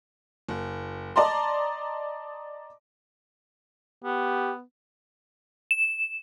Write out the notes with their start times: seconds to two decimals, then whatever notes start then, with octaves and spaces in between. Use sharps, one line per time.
0.49 F#1
1.16 D5 D#5 A5 A#5 C6
4.04 B3 G4
5.71 E7